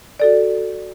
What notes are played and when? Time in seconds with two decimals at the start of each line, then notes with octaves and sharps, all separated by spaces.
0.20 F#4 A4 D5